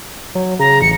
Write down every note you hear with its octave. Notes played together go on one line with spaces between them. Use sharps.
F#3
C#3 A#5
A1 C#7